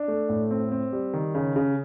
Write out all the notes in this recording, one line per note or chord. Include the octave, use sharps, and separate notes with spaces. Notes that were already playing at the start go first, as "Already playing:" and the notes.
Already playing: D4
A3
A2
C4
C4
G3
D#3
C#3
C#3